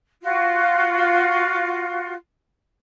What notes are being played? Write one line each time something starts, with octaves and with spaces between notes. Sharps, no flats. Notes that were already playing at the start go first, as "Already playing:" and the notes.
F4 F#4